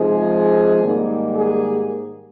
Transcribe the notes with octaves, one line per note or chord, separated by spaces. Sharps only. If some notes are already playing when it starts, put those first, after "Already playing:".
Already playing: C3 F3 G#3 D#4 G#4
G#2 D#3 G3 A#3
G#4